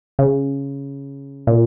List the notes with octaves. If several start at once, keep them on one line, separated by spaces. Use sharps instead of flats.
C#3
A#2